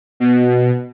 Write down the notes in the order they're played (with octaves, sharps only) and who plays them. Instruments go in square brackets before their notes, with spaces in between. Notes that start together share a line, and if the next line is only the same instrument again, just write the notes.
[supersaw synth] B2